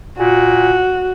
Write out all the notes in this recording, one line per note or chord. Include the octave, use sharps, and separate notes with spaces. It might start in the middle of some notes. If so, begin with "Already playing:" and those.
A#2 F#4